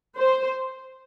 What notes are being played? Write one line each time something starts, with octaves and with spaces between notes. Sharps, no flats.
C5